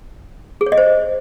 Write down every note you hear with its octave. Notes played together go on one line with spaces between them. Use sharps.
G#4
C#5
D#5
C5